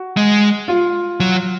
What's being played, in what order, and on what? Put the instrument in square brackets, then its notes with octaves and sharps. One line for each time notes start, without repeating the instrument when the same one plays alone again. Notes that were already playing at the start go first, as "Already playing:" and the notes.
Already playing: [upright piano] F#4
[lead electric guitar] G#3
[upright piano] F4
[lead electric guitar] F#3